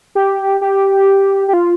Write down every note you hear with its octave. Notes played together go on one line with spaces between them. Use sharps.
G4
G4
G4
F4